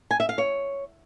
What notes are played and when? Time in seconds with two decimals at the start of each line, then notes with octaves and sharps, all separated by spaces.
0.11 G#5
0.20 E5
0.29 F5
0.38 C#5